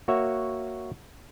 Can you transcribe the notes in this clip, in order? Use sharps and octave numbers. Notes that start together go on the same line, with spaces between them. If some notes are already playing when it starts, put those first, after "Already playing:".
A#3 F#4 C#5 E5 F#5